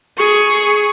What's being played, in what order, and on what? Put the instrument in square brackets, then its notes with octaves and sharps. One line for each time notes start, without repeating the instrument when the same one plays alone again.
[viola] G#4 C#6